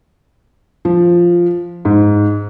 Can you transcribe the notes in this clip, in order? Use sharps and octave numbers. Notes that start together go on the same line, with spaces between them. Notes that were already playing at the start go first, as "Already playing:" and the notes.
F3
G#2